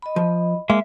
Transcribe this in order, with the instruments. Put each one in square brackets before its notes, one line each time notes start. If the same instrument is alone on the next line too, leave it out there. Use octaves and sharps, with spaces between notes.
[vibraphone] D#5 B5
[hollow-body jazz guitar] F3
[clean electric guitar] G#3 A#3 [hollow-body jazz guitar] E5